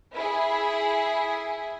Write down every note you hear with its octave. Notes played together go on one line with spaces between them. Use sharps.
E4 G#4